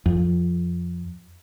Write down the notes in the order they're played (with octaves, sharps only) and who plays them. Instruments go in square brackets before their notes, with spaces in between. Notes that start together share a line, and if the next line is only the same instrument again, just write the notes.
[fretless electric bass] F2